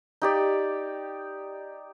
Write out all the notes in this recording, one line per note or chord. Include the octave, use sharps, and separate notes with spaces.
D#4 G4 D5